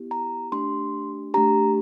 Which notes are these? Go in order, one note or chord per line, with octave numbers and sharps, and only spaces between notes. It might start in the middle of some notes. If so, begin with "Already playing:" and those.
Already playing: B3 E4 G4
A#5
A3 D4 G4 C6
A3 D4 G4 A#5